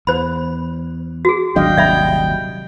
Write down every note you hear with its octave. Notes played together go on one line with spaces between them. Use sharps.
E2 C5 B5
F#4 G#4
D#1 G#1 F#3 D4 D#5 F5 G5
C3 D5 E5 B5